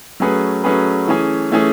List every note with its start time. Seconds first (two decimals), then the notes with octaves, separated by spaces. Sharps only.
0.20 F#3 A3 C#4 G#4 B4
0.64 F#3 A3 C#4 G#4 B4
1.08 E3 A3 C#4 G#4
1.52 E3 A3 C#4 G#4